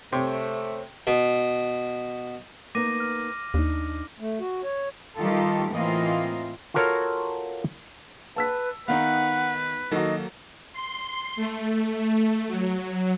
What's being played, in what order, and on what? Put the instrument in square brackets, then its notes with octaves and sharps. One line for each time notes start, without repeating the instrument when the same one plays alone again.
[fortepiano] C3 [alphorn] A3 [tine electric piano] C5 C#5
[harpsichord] B2
[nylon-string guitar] A#3 B3 D#4 [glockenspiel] D6 A#6 D#7
[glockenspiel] F6
[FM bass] D#2 [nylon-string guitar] D4 D#4
[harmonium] A3
F#4
C#5
[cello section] D#3 G3 F4 G4 A4
A2 E3 A#3 C4 F4 D#5
[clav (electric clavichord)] F4 F#4 A4 A#4 C#5 F5
[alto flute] B4 [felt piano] A5 E6 B6
[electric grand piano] D#3 F5 [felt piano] B3 D#4 [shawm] B4 [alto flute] F#5
[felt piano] D#3 F#4 [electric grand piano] F#3 A#3 A4 [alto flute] D#5
[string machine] C6
A3
F#3